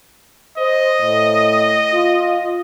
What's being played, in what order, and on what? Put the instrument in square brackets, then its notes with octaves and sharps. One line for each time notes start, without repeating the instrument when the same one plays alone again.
[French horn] C5 [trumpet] D#5
[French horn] A2
F4